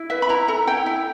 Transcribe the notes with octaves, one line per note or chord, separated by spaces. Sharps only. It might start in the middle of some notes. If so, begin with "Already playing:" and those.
Already playing: E4
B4 E5
B5
E4 A#5
A4 A#5
E4 G5
E4